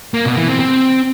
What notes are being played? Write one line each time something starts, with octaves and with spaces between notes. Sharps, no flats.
A#3
B2
E3
C4
C4